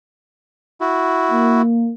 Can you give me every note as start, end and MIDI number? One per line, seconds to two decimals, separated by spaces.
0.81 1.62 64
0.81 1.62 66
1.31 1.93 58